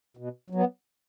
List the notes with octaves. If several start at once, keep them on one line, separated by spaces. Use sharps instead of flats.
B2
F#3 B3